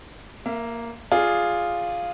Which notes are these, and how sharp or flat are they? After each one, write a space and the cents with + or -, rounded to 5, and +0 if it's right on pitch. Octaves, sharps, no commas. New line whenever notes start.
A#3 +0 E5 +35
F4 +0 G#4 -5 D5 +0